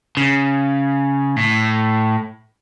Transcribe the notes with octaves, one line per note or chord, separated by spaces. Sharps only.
C#3
A2